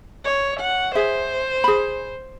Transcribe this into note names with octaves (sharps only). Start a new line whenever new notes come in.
C#5
F#5
G#4 C5 E5
G#4 B5